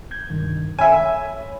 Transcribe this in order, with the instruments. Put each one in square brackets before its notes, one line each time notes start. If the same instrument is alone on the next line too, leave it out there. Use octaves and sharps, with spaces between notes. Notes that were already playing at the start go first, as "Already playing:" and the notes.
[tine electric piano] G6 G#6
C2 G2 D#3
[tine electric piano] C#5 B5 [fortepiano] E5 G#5